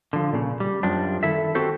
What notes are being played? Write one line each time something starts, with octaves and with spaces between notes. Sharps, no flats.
D3 F3
A#2 C#3
G3
F#2 F3 G3 D4
D#3 E4 A4 E5
C4 F#4 G4 A4 C5